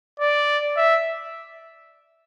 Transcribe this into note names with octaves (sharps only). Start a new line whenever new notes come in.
D5
E5